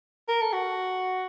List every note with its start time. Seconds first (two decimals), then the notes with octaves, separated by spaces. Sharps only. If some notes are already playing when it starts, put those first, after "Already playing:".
0.28 A#4
0.41 A4
0.53 F#4